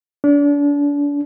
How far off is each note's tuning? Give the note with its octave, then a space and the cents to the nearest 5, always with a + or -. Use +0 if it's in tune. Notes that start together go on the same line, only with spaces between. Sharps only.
D4 -35